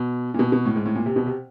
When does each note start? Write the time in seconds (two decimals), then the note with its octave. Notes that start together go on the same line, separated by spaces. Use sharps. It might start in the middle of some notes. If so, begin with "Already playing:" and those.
Already playing: B2
0.34 A#2
0.39 B2
0.52 B2
0.65 A2
0.76 G#2
0.85 A2
0.95 A#2
1.06 C3
1.16 B2
1.26 C3